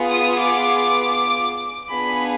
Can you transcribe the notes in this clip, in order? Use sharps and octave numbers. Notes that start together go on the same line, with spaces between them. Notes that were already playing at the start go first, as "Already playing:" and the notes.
Already playing: B3 F4 G#4
D#6
D6
B3 D4 F4 G#4 B5